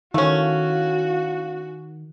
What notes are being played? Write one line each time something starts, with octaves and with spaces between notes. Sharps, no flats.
D#3 A3 C#4 E4 F#4 F5